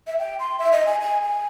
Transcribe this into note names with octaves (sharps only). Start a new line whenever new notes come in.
E5
G5
C6
E5
D#5
G#5
G#5
G#5